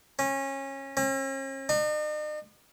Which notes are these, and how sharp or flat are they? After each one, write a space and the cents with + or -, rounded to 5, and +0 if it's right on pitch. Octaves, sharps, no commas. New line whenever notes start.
C#4 -25
C#4 -45
D#4 -45